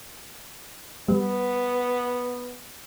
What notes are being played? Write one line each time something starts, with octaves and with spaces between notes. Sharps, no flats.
G3 B3